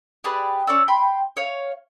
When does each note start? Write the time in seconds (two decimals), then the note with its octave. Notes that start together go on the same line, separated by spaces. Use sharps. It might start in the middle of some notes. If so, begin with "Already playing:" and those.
0.24 G4 G#4 B4 D5
0.67 C#4 C#5 D5 E6
0.88 G5 B5 C6
1.37 C#5 F5